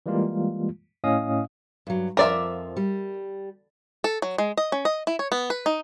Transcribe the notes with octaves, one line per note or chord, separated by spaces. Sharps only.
E3 G3 G#3 A#3 F4
A2 C#4 D#5 F5 D#6
G2 F#3
F2 F3 A#4 D5 E5
G3
A4
F#3
G#3
D#5
C#4
D#5
E4
C#5
B3
B4
D#4